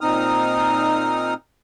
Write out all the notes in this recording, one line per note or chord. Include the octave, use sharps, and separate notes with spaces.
A#2 C4 D#4 D#6 F6